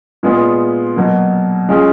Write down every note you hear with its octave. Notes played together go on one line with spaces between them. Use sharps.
A#2 G#3 B3 F4 G#4
B2 F#3 A#3
G#3 C#4 F4 G#4